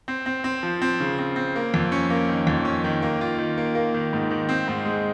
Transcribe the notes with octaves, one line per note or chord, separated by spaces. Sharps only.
C4
C4
C4
F3
C4
C#3
C4
C4
A#3
F2
C#4
A#3
D#3
F2
C#4
D#3
A#3
F4
D#3
A#3
A#3
D#3
G#2
D#3
C4
G#2
G#3